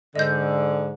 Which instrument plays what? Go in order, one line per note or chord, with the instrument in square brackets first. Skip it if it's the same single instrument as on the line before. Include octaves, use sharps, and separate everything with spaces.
[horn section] G#2 D3 [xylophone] D#5 G6